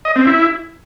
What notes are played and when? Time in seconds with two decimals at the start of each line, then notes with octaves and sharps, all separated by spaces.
0.05 D#5
0.16 C4
0.27 E4